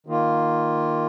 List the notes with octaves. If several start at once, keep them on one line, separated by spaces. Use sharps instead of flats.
D#3 A#3 F4